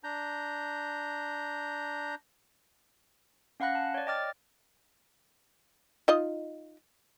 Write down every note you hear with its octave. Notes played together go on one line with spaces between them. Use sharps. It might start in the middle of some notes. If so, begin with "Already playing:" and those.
D4 A#5 G6
C#4 F5 F#5 B5 F#6 A#6
A5
C#5 D5
D#5 G5 D6 F6 A6
D#4 F4 D#5